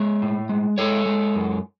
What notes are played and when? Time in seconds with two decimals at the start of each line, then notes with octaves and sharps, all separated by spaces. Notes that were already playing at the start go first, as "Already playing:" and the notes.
Already playing: G#3 C#5 E5
0.22 A2
0.49 G#3
0.78 G#3 A4 C#5
1.06 G#3
1.35 F#2